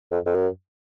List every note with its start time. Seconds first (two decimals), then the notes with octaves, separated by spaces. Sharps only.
0.12 F2
0.26 F2
0.34 F#2